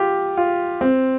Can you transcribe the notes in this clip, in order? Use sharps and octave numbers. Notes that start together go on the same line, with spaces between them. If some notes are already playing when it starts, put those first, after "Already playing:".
Already playing: F4 G4
F4
C4